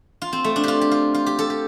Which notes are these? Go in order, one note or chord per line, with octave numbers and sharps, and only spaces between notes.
F4
C4
A3
D4
F4 G4
G4
F4
F4
G4
A4
G4